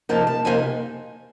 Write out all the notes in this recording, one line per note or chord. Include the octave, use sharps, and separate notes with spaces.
F2 C3 F3 A#3 D#4 A5
A5
F2 C3 F3 A#3 D#4 G#5